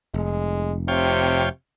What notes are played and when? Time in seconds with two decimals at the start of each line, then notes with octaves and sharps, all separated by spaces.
0.14 F1 G#3
0.88 C3 F4 C#5 G5